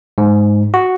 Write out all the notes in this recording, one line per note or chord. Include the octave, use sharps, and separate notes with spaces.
G#2
F#4